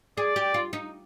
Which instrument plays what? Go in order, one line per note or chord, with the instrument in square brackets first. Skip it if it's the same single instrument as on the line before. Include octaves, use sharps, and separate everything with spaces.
[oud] G#4 [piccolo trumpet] D5
[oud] G4
F4
D#4